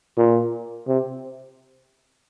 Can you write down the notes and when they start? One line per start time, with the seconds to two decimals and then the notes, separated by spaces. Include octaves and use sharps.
0.18 A#2
0.88 C3